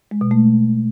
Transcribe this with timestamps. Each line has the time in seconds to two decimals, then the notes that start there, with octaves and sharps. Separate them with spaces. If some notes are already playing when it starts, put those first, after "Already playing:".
0.11 G#3
0.21 B2
0.31 A3